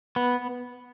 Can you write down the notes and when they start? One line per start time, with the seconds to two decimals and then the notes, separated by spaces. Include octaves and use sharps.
0.16 B3